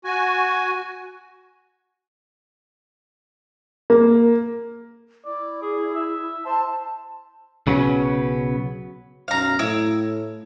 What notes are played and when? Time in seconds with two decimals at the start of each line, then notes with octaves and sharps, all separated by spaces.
0.05 F#4 G#5
3.90 A#3
5.25 E4 D5
5.62 G#4
5.95 E5
6.46 C5 A5
7.67 B1 C#3 F#3 B3 C#4
9.28 B1 F#2 F5 A#5
9.59 A2 E4 E6